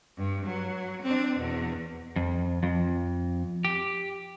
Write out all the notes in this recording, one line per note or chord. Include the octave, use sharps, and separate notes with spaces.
G2
F#3
C4 D4
E2 B2
F2
F2
G4